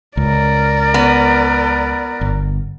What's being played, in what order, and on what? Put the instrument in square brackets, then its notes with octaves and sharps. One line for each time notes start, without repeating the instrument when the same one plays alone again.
[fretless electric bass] C#2 [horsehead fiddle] A#4 D5
[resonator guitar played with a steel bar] B3
[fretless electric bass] G1